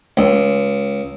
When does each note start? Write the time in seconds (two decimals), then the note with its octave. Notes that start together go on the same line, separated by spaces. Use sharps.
0.17 C#2